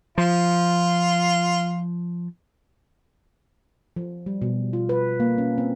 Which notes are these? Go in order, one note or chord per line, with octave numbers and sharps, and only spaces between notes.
F3 F4
F3
G3
B2
F4
B4
A#3
C#4
C4